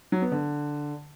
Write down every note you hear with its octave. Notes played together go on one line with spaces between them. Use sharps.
F#3
B3
D3